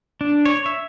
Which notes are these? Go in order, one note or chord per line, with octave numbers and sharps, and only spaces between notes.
D4
C#5
E5